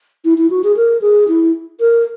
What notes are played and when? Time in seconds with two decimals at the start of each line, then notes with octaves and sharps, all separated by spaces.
0.25 E4
0.38 E4
0.50 F#4
0.64 G#4
0.77 A#4
1.01 G#4
1.28 E4
1.80 A#4